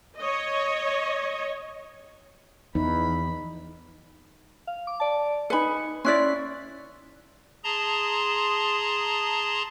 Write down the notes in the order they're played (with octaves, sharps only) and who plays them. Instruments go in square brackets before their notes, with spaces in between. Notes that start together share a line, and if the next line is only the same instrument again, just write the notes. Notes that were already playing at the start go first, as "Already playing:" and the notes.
[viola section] C#5 D#5
[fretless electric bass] E2 [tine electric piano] E3 F3 [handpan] D#4 [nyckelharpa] B5
[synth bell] F5
D6
D5 A5
[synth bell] D#4 G#5 C#7 [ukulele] B4 B5
[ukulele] C#4 E4 D5 [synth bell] C6 F#6 B6
[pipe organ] G#4 A5 A#5 C6